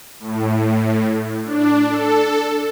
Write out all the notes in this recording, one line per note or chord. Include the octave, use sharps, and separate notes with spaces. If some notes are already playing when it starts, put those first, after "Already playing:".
A2
D4
A4